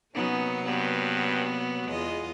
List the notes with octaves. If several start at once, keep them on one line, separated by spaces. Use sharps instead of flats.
C3 F#3 A#3 B3 C#4 D#4
G2 B3
E2 G#3 F4 D#5